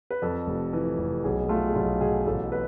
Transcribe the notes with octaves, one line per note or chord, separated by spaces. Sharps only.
B4
F2 A4
F1
E3
F1
B1 G#4
A3 F4
G#4
B1 F4
B2 G#4
A1 A4
B4